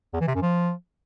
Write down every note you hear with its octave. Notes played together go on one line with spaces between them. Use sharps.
E2
E3
C3
F#2
F3